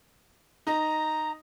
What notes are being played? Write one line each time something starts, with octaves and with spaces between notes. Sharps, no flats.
D#4 A#5